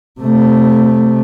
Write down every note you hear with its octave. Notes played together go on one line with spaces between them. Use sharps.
C3 A3